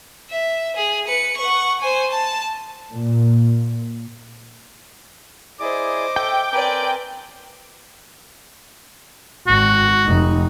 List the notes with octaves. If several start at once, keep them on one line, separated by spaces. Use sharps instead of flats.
E5
G#4
B4 C#7
F#5 C#6
C5 G#5
A5
A#2
E4 G#4 C5 D5 D#5 D6
A4 E5 G5
C4 A#4 B4 D5 G#5 D6
G#1 F#4
F1 D#4